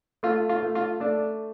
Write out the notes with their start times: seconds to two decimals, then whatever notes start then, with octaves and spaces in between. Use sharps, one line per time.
0.23 A3 F4
0.49 F4
0.62 A3
0.75 F4
1.00 A3 D4